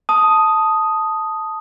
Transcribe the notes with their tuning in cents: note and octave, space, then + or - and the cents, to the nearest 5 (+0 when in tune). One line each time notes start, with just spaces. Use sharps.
A5 +0 D#6 +0